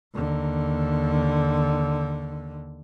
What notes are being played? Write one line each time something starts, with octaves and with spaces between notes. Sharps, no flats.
D#2 D3